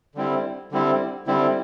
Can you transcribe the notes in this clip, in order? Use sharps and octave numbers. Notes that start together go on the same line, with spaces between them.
D3 G3 C4 E4
D3 G3 C4 E4
D3 G3 C4 E4